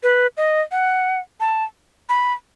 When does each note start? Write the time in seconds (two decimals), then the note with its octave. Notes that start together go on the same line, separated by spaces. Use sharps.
0.03 B4
0.37 D#5
0.71 F#5
1.40 A5
2.09 B5